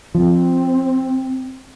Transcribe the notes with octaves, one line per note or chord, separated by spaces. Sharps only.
F3 C4